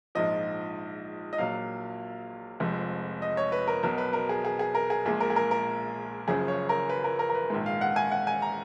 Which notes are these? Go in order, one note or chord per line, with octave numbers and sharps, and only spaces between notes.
A#1 G#2 F3 D#5
D#5
A#1 A#2 F#3 F5
F1 F2 F3 G#3
D#5
C#5
B4
A#4
B1 B2 F#3 A#4
B4
A#4
G#4
G#4
G#4
A#4
G#4
A#1 A#2 G#3 G#4
A#4
G#4
A#4
A#4
F#1 F#2 C#3 F3 G#4
C#5
A#4
B4
A#4
A#4
A#4
B4
A#1 G#2 D#3 G#3
F5
F#5
G#5
F#5
G#5
A#5